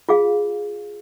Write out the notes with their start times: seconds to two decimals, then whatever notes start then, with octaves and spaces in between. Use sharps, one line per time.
0.09 F4 G#4 F5